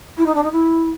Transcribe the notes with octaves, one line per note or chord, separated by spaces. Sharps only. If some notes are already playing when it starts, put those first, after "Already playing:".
E4
D#4
D4
D#4
E4